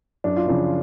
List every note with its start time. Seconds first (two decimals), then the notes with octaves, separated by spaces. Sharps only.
0.24 F#2 D4
0.37 F4
0.47 C#3 F3 D4